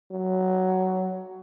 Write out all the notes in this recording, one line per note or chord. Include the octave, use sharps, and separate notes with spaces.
F#3